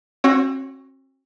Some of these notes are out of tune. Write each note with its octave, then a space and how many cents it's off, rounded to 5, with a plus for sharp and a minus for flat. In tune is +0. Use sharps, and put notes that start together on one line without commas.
C4 +40 F#4 +0 C#5 +0